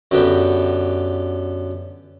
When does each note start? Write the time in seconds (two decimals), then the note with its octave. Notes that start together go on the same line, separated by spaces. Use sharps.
0.11 F#2 D3 B3 G4